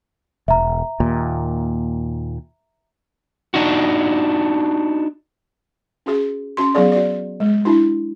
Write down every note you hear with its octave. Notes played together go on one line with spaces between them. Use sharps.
E1 E5 A#5
D#2 A#2
D4 D#4 F#4
C#4 F#4 G#4
C#4 F#4 C6
F#3 B3 G#4 D5
F#4 D5
G#3
D4 E4 F#4